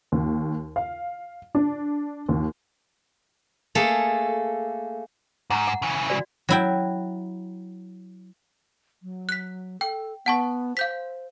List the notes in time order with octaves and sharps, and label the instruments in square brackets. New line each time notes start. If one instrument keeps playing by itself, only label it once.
[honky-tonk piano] D#2
F5
D4
D#2
[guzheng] A3 A#3 G#4 A4
[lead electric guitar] G#2 [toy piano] F#5 A#5 C#6
[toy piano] F#5
[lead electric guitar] C#3 E3
[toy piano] F#4 D5
[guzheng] F#3 E4 G5
[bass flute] F#3
[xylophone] F#6 B6
[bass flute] A4 [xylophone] G5
[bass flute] B3 [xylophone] F#5 A5 C#6
[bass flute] C5 [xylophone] F5 G6 B6